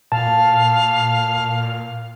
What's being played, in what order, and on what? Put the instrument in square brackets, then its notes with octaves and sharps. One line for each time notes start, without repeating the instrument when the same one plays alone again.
[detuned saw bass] A#2 [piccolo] F5 [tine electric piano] A5